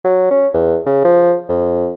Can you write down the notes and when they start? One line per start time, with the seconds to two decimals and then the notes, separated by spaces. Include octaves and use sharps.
0.05 F#3
0.31 C#4
0.54 E2
0.86 C#3
1.05 F3
1.49 F2